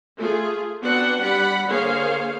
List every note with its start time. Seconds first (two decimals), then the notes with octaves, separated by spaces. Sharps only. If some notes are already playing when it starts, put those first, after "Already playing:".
0.16 A3 F4 G#4
0.81 B3 C4 D4 F#4 B4 F#5
1.21 G3 D5 F#5 B5
1.68 D3 A#3 G#4 C5 C#5 F5